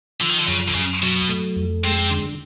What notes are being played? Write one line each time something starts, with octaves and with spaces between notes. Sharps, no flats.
D3 F3
D#3
D3
F#2 C#3
D3
F#2 C#3
B2 F#3
A3
F2
C3 G#3
D3